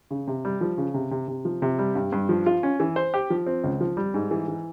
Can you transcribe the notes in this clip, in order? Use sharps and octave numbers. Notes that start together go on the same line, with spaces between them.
C#3
C3
G3
F3
C#3
C3
C3
C3
F3
C3
G3
G2
G2
F3
F4
C#4
E3
C5
G4
F3
C4
C#2
F3
G3
G#2
E3
E3